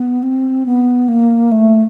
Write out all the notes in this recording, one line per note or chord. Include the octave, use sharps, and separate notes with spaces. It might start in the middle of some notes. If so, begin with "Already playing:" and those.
Already playing: B3
C4
B3
A#3
A3